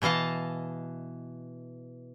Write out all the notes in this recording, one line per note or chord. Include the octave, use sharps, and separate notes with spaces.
B2 E3 D#5 F5 A5